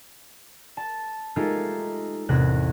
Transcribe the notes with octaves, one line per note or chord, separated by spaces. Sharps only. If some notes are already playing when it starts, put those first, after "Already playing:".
A5
G#3 A3 D#4 F4 G4 A4
A1 E2 C3 F#6 A#6